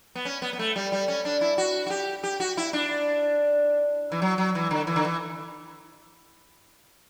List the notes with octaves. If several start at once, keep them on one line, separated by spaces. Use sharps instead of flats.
B3
C#4
B3
B3
A3
G3
G3
C#4
D4
E4
F#4
F#4
G4
G4
F#4
E4
D4
E3
F#3
F#3
E3
D3
E3
D3
E3